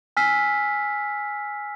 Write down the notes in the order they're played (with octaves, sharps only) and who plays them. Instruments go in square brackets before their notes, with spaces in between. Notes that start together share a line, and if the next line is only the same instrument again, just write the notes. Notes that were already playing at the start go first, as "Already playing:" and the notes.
[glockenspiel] G#5 E6 F6 B6 C7